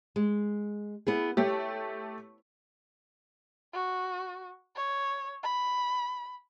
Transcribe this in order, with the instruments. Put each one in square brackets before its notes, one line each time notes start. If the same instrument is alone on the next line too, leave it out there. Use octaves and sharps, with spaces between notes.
[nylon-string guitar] G#3
B3 E4 G#4
[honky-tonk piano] A3 G4 [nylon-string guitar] C#5
[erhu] F#4
C#5
B5